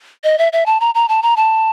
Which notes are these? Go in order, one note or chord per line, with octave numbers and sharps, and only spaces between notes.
D#5
E5
E5
A5
A#5
A#5
A5
A#5
A5